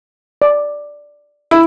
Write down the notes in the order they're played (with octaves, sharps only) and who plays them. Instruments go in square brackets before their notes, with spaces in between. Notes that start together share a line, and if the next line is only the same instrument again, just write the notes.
[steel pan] D5
[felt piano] E4